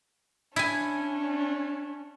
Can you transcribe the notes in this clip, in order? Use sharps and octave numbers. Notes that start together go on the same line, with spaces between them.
C#4 D4 E4 G#5